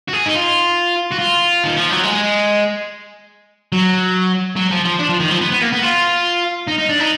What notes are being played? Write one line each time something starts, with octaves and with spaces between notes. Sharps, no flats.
F#4
G#4
D#4
F4
F#4
F4
D#3
F3
F#3
G#3
F#3
F#3
F3
F3
D4
F3
D#3
F3
B3
B3
A#3
B3
F4
D#4
D#4
D4
D#4